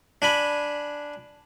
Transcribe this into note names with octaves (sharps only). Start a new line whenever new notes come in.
D4 G#5 B5